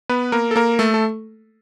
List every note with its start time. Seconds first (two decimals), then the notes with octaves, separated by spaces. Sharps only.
0.09 B3 B4
0.32 A#3 A#4
0.51 A4
0.56 A#3 A#4
0.79 A3 A4
0.94 A4